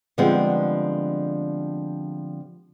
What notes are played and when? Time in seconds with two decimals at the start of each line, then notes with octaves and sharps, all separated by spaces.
0.18 D3 F3 G3 G#3 B3 C4